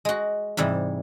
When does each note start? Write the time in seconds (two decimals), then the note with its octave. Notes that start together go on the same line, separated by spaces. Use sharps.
0.05 G#3 F#4
0.57 G#2 C3 E3 G3